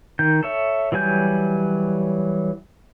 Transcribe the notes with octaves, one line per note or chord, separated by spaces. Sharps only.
D#3 G6
A4 C#5 E5
E3 F#3 G3 G#5 G6